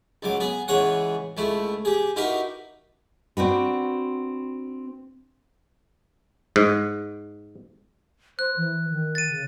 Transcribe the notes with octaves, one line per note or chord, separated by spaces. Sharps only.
C#2 F#3 D6
B3 G#4
C#2 E3 G#4 C#5 F#5
C#2 A3 E4
G4 G#4
D#4 E4 F#4 G4 A#4 B4
C4 D4 F#4 B4
G#2
C5 F#6
E3
D#3
A6 D#7
C#3